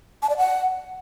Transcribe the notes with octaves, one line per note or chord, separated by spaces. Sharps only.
A5
D5
F#5